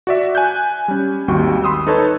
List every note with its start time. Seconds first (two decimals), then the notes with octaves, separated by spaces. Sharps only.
0.07 F#4 D5 E5
0.35 G#5 F#6 G6
0.88 G3 C#4
1.28 G#1 D#2 G3 F#4 G5 C#6
1.64 B5 C6 D#6 E6
1.87 D#4 A4 B4 C#5 A5